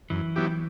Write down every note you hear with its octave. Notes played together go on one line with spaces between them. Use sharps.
F#2 E3
F#3 B3 E4 G4